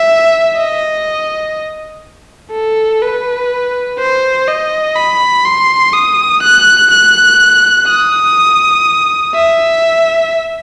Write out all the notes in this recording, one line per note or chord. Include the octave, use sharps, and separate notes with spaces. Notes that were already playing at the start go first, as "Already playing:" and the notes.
Already playing: E5
D#5
A4
B4
C5
D#5
B5
C6
D#6
F#6
F#6
D#6
E5